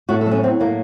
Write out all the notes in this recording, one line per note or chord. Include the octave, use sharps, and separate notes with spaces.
A2 F#4
A4
F#3
C#4
F#3 C4
A2 A#3